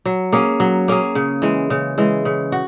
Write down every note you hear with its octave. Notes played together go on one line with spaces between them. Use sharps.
F#3
A#3 C#4 G#4
F#3
A#3 C#4 G#4
C#3
E3 G#3
C#3
E3 G#3
C#3
F#4